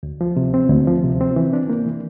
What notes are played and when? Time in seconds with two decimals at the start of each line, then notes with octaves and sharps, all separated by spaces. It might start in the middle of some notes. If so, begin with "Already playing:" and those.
0.03 D2
0.21 F3
0.37 C3
0.54 C4
0.70 D2
0.87 F3
1.04 C3
1.21 C4
1.36 E3
1.53 D4
1.70 A#3
1.86 E3